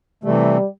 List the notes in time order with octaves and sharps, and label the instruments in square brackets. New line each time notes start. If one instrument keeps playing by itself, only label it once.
[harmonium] C3 E3 A3 [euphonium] G3